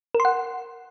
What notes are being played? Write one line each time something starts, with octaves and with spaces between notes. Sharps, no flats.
A#4
C6
F#5